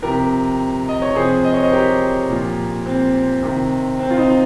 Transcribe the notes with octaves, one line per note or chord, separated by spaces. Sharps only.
C3 F3 G4 A#4
D#5
C#5
C3 F3 G#4 C5
D#5
C#5
C5 D#5
G4 A#4
A#2 F3
C4
C3 D#3
C4
F4
C4 D#4